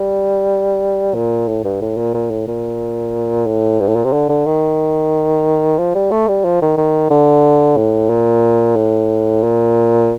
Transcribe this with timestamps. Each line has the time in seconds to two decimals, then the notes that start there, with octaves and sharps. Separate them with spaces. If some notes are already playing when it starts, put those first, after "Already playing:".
Already playing: G3
1.14 A#2
1.48 A2
1.64 G2
1.81 A2
1.97 A#2
2.14 A#2
2.31 A2
2.47 A#2
3.46 A2
3.80 G2
3.88 A2
3.96 A#2
4.04 C3
4.13 D3
4.29 D3
4.46 D#3
5.78 F3
5.95 G3
6.11 A3
6.28 G3
6.45 F3
6.62 D#3
6.77 D#3
7.10 D3
7.77 A2
8.10 A#2
8.76 A2
9.43 A#2